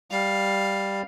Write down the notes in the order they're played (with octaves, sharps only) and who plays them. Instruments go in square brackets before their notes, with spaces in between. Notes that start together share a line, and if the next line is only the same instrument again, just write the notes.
[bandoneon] G3 [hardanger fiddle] F5